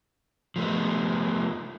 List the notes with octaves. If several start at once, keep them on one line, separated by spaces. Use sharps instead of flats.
F3 A3 B3